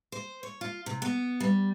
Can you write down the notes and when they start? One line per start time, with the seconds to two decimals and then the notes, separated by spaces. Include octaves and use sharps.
0.12 C5
0.43 C#5
0.61 F4
0.86 C3
1.02 B3
1.40 G3